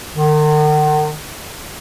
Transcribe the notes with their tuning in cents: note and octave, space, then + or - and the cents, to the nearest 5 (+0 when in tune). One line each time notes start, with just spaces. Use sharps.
D#3 -45